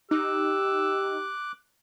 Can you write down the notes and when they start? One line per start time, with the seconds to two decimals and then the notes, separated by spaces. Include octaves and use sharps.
0.11 D#4 G4 D6 E6 F#6